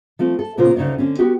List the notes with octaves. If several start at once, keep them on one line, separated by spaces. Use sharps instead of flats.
F3 A3 C4
A4
A#2 C#3 A#3 B3 F4 C5
D2 C#3 D#4 C#5 D5
D3 C4 C#4
B3 F#4 G4